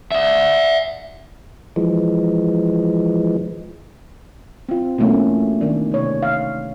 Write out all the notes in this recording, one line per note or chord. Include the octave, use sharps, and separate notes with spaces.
D5 E5
E3 F3 G#3
C4 F4
B2 E3 A3 A#3 C#4
D#3 D4
C3 C#5
F5